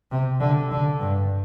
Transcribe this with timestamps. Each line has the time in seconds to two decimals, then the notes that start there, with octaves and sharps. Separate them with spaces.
0.11 C3
0.40 D3
0.71 D3
1.00 G2